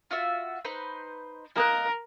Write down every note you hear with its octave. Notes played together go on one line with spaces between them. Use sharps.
F4 F#4 E5
D#4 B4 C5
A#3 A#4 D#5 F#6